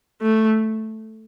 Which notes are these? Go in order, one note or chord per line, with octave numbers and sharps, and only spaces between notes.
A3